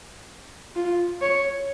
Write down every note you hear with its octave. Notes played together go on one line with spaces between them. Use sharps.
F4
C#5